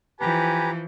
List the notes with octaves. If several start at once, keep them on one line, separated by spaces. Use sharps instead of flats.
E3 F3 G4 B4 G#5 A#5